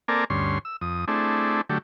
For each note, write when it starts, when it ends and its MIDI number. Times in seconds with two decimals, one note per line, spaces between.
0.08 0.24 58
0.08 0.24 60
0.08 0.24 69
0.08 0.24 70
0.08 0.24 74
0.08 0.24 80
0.30 0.59 38
0.30 0.59 43
0.30 0.59 61
0.30 0.59 84
0.65 0.77 88
0.81 1.05 41
0.81 1.05 87
1.08 1.61 57
1.08 1.61 60
1.08 1.61 62
1.08 1.61 64
1.08 1.61 68
1.69 1.78 50
1.69 1.78 54
1.69 1.78 57
1.69 1.78 67